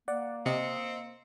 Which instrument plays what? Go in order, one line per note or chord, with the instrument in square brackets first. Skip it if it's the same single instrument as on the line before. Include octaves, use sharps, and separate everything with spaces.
[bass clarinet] A#3 [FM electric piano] D5 F#5
[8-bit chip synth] C3 [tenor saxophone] C4 [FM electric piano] D#5 C#7